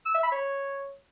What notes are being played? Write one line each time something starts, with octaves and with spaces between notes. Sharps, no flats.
E6
E5
B5
C#5